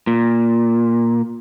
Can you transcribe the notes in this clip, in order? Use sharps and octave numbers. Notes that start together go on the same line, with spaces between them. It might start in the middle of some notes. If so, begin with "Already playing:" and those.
A#2